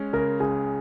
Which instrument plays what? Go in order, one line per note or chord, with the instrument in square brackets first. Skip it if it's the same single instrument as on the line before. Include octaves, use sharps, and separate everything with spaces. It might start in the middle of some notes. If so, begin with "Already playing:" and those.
Already playing: [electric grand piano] G#3 C#4
[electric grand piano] C#3 [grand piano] A#4
[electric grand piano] C#2 [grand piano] G#4